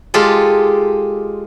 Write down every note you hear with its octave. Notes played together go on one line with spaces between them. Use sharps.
G#3 F4 G4 A4